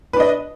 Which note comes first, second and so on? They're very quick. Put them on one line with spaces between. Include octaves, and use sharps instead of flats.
B4 D4 D#5